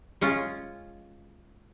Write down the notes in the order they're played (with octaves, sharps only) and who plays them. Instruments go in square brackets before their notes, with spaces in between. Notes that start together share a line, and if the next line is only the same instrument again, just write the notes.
[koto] G#3 C#4 F4